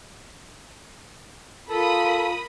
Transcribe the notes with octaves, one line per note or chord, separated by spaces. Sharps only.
F4 A4 A#4 A5 B5 D#6